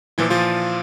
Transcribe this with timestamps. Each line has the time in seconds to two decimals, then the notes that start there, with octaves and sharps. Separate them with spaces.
0.18 A#2 E3 F3 E4
0.30 F3 F4